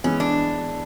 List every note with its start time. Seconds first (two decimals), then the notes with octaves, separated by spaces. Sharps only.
0.04 E3 G#3 B3 C#4
0.20 D4